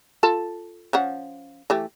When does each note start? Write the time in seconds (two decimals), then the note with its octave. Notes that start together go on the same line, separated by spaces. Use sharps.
0.23 F4 A4 A5
0.93 F3 C#4 F#5
1.70 E3 A3 G4